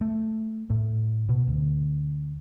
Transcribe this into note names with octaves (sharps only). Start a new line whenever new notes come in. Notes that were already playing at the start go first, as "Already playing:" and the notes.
A3
A2
B2
D2